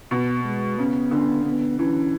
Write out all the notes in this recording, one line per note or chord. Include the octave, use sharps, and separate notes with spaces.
B2 B3
G#3
C#3 B3
D3
B3
E3 C#4